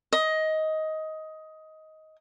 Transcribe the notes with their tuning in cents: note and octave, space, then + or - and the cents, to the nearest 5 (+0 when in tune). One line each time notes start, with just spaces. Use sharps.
D#5 +15